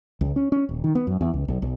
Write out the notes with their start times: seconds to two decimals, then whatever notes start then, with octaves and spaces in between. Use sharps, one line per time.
0.21 C#2
0.36 C#4
0.52 C#4
0.69 D#1
0.84 D#3
0.95 B3
1.07 F#2
1.21 E2
1.34 C#2
1.48 B1
1.62 B1